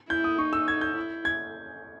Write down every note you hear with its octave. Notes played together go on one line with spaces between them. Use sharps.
E4 G6
D#6
D#4 C#6
E6
G#6
G6
E4
G#6